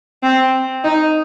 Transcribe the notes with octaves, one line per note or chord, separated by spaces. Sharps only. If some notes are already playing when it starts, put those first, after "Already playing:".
C4
D#4